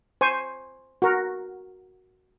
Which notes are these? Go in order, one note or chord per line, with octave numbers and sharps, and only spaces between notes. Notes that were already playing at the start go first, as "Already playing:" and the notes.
C5 G#5 C#6
F#4 A#4